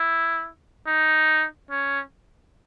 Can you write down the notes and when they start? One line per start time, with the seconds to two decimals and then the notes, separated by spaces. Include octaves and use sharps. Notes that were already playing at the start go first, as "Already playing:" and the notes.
Already playing: E4
0.87 D#4
1.71 C#4